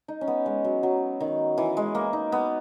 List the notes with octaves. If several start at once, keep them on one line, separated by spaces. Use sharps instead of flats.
D#4
C#4
B3
G#3
F#3
F#3
D#3
E3
G#3
A#3
D#4
B3